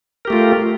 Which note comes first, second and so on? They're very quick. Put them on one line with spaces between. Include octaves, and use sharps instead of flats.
A#4 G4 A3 F4